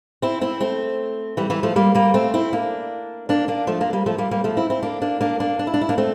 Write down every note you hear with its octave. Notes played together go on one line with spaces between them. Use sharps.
C4 E4
C4 E4
A3 C4
E3 G3
E3 G3
F3 A3
G3 A#3
G3 A#3
A3 C4
C4 E4
A#3 D4
A#3 D4
A#3 D4
F3 A3
A#3 D4
G3 A#3
F3 A3
G3 A#3
G3 A#3
F3 A3
C4 E4
C4 E4
A#3 D4
A#3 D4
A#3 D4
A#3 D4
D4
E4
D4
E4
A#3 D4
A3 C4